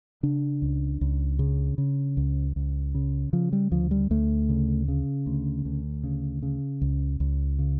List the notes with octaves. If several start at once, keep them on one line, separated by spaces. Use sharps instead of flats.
C#3 D4
C#2
C#2
C#3
C#3
C#2
C#2
C#3
C#3 F3
G3
D2 F3
G3
D2 A3
C#3
C#3
D2
D2
C#3
C#3
C#2
C#2
C#3